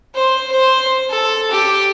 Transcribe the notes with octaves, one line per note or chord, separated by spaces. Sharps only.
C5
C5
A4
G4